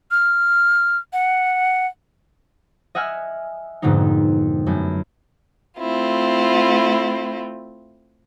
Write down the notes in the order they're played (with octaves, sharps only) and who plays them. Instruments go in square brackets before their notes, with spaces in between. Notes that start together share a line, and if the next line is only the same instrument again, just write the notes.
[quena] F6
F#5
[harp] D#5 E5 F#5 G#5 E6 F6
F2 G#2 B2 D3 A#3 D#4
F#2 A3 B3
[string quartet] A3 C4 E4 F4